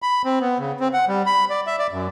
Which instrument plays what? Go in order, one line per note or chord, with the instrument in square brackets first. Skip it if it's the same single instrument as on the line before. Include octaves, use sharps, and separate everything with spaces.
[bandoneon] B5
C4
B3
C#3
C4
F#5
G3
B5
D5
E5
D5
F#2